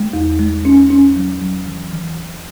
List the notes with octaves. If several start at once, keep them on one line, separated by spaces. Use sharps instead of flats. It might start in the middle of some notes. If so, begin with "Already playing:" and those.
Already playing: G#3
E2
G#3
C#4
C#4
F#3
F#3
E3
E3